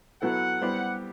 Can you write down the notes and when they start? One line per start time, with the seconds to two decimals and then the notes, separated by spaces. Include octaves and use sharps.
0.22 F#3 B3 E4 A4 F#5
0.61 G3 B3 E4 G4 C5